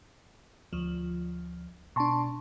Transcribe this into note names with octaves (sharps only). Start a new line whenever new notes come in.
D2 F3
B2 D4 A5 C6 C#6